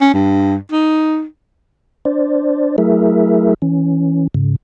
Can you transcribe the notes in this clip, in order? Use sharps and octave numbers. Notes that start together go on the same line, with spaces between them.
C#4
G2
D#4
D4 C5 D5
F#3 A3 E4 G#4 A#4 E5
E3 C#4
G#2 C#3